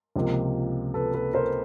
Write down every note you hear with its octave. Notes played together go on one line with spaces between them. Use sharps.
C#2 C3 F3 A#3
A4 B4
A4 B4
A#4 C5